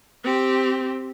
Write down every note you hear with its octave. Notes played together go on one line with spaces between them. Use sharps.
C4 G4